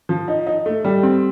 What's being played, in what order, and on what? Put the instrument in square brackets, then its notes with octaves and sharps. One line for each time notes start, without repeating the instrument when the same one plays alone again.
[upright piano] F3
D#4
D#4
A3
G3
C4